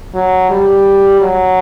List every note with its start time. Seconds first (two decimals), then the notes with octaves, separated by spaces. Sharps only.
0.15 F#3
0.50 G3
1.22 F#3